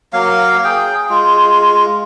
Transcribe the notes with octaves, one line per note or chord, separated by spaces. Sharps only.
F#3 A#3 F5
G#4 G5
G#3 F4